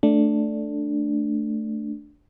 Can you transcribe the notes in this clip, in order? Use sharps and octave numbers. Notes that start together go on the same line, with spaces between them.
A3 D4